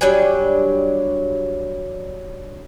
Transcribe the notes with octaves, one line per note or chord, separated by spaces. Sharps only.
F#3 G3 D4 G#5